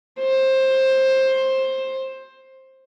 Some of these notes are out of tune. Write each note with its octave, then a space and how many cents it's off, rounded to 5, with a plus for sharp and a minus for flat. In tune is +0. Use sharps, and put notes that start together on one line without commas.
C5 +15